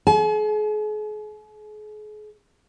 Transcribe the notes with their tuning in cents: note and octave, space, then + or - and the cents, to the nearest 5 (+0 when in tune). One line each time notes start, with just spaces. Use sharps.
G#4 +40 G#5 +45